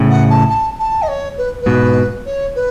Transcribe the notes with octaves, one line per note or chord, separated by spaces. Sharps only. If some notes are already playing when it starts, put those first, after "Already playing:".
Already playing: A2 C#3
F#5
A5
A5
A5
D#5
C#5
B4
B4
G#2 B2
C#5
B4